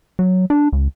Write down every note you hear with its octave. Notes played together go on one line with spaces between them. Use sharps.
F#3
D4
C#2